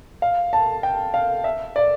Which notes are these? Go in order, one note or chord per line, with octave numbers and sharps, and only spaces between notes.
F5
A5
G5
F5
E5
D5